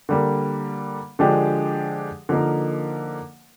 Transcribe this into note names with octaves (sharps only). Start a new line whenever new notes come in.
D3 G3 A#3
D3 F3 G#3 D4 G4
D3 F3 A#3 D#4 A#4